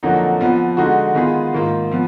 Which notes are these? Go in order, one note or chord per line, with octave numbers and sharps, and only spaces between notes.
F2 D3 F#3 A#3 D#4
F2 F3 B3
D3 G#3 D#4 F#4
D#3 G#3 B3 F4 G#4
G#2 D#3 A#3 F4
F3 B3